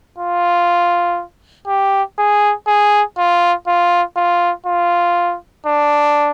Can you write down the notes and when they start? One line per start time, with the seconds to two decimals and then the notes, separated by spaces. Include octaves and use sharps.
0.18 F4
1.68 G4
2.18 G#4
2.67 G#4
3.18 F4
3.67 F4
4.16 F4
4.66 F4
5.67 D4